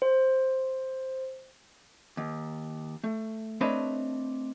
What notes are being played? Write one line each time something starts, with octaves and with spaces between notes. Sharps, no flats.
C5
D#2
A3
A3 C4 D4 B4 C#5 D#5